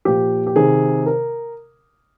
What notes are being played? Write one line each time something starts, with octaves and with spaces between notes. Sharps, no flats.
A#2 F3 G4
G4
C3 D#3 G#4
A#4